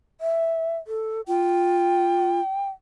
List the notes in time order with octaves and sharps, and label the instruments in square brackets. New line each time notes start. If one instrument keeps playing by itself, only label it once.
[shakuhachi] E5
A4
[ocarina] F4 [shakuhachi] G5